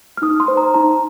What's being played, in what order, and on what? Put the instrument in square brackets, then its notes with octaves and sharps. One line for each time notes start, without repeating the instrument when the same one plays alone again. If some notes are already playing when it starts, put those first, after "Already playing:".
[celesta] F6
D#4 D#6
C6
C5
A#5
D#4 A#5